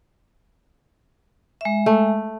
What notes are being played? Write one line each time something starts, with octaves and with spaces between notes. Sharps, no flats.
G#3 E5
A3